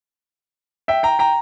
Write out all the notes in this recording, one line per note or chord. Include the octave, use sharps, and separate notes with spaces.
E5 G5
G5 A#5
G5 A#5